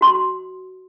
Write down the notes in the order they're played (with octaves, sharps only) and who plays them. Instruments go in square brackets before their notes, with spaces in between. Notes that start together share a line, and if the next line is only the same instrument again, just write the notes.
[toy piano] F#4 C6